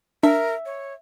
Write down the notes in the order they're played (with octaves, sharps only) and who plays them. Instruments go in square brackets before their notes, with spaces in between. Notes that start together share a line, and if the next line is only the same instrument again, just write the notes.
[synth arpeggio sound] D4 [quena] A#4 [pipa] E5
[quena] C#5